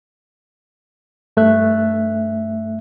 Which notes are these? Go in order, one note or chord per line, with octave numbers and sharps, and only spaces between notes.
G2 A3 A4 E5 F#6